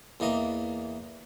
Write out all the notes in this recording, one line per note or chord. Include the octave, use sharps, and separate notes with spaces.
E2 E3 A#3 D#5